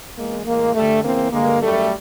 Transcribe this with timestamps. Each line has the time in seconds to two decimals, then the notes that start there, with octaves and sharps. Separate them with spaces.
0.17 E2 C#3 E3 G#3 A#3
0.46 A2 E3 G#3 A#3
0.75 G2 D3 G3 A3
1.04 E2 C#3 E3 A#3 C4
1.32 G2 D3 G#3 A#3
1.62 F#2 D#3 G3 A3